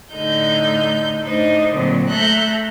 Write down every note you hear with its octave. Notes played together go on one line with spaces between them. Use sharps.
A2 D3 D#4 G6
A2 D4 D#4 C5
A#2 D3 F#3 C4
A3 A4 E5 A#5 F#6 G6